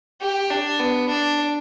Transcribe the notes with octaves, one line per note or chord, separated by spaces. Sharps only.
G4
D4
B3
D4